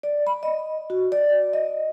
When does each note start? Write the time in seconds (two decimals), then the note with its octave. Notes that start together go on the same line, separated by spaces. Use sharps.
0.03 D5
0.27 B5
0.43 D#5
0.90 F#4
1.12 D5
1.53 D#5